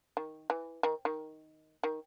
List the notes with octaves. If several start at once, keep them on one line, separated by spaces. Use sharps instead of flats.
D#3
E3
D#3
D#3
D#3